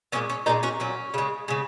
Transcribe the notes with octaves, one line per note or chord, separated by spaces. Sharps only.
A#2 G#3 C#4
C#4
A#2 G#3 A#3 D#4
C#4 F#4
A#2 F#3 C#4
C#3 G#3
C#3 G#3